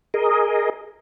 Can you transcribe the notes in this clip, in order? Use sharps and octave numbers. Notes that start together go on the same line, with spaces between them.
G#4 A#4 D#5